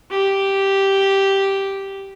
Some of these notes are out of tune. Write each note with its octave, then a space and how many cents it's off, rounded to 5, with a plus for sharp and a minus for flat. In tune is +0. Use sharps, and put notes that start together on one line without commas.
G4 -5